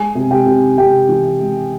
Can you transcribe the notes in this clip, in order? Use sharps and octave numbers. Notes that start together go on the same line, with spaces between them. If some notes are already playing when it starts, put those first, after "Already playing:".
Already playing: G#3 G#4 G#5
C3
G4 G5
C3
C3 G4 G5
E3
G#3